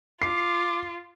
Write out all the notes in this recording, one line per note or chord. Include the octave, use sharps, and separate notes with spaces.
F4 D6 C7